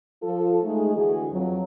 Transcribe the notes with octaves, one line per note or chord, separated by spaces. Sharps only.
F3 F4 A4
G#3 A3 D#4 G#4
D3 E3 F#4 G#4
F2 F#3